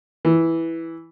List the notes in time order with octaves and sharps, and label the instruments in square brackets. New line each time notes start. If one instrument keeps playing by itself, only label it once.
[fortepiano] E3